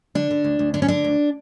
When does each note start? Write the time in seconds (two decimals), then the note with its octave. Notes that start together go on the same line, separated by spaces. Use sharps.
0.15 D3 D4
0.31 D3
0.44 D2
0.59 D2
0.74 D3 D4
0.82 C#4
0.88 D3 D4
1.04 D2